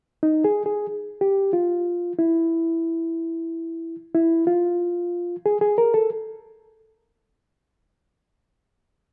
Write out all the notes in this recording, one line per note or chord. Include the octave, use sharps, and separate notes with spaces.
D#4
G#4
G#4
G4
F4
E4
E4
F4
G#4
G#4
A#4
A4